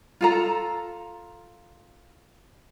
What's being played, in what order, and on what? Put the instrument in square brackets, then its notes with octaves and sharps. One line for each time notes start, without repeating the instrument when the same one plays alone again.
[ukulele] F4 A4 A#5